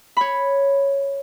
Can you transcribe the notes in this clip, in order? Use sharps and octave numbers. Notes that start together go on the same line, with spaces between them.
C#5 B5